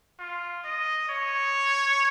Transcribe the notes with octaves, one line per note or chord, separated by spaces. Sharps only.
F4
D#5
C#5